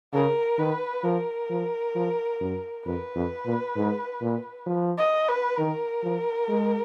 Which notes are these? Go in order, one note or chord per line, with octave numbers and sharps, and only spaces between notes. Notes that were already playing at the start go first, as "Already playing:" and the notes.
C#3 A#4
D#3 B4
F3 A#4
F3
F3
F#2
F2 B4
F2
A#2
G#2
A#2
F3
D#5
B4
D#3 A#4
F3
G#3